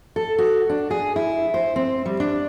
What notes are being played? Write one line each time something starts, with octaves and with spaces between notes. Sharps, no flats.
A4
F#4
D4
G#4
E4
C5
C4
G3
D4